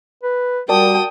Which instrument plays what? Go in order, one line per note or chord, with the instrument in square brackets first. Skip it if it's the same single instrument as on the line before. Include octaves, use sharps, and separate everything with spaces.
[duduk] B4
[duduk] G3 [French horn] F#4 [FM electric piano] A#4 D5 A5 [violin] G5 D#6